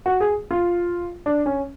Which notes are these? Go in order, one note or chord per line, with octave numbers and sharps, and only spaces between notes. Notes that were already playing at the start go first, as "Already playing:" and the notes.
F#4
G#4
F4
D4
C#4